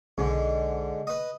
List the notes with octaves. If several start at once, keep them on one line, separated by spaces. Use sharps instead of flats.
B1 G#2 D3
B4 D#5